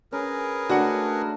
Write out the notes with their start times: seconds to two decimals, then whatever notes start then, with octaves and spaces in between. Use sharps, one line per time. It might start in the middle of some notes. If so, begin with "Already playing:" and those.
0.12 C#4 G#4 A#4 B4
0.69 A3 D4 F#4 D#5 F#5